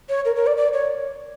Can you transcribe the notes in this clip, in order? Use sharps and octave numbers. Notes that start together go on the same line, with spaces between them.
C#5
A#4
A#4
D5
D5
C#5